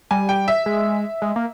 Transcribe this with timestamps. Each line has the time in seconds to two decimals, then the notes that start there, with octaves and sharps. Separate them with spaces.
0.11 G3 G#5
0.29 G5
0.48 E5
0.66 G#3
1.22 G#3
1.36 A#3